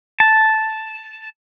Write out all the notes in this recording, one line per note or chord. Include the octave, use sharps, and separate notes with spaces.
A5